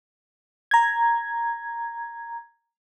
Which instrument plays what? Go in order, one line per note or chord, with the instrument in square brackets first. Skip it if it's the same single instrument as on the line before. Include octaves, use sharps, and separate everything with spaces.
[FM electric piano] A#5 G#6